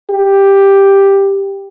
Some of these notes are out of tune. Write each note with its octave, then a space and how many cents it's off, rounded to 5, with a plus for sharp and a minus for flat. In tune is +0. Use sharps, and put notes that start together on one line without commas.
G4 +5